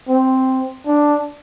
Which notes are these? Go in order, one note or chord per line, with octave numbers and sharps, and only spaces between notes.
C4
D4